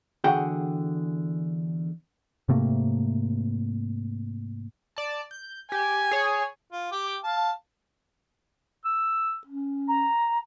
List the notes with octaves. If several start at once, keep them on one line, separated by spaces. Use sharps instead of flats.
E2 D3 F#4 G#4 F#5 G5
G#2 C3 A3 A#3
D5 A5
G6
G4 G#5
G#4 C#5
F4
G4 G5 D6
F5 A5
E6
C#4
A#5